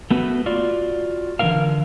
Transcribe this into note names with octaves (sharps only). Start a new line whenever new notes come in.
A3 B3 F#4 B4
F4 F#4 D5
D3 E3 G#3 F4 A#4 F5